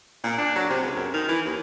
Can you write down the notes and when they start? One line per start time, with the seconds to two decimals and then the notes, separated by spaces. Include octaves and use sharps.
0.23 A#2
0.38 D4
0.56 F#3
0.70 C3
0.82 C#2
0.96 F#2
1.14 D#3
1.28 E3
1.45 D#2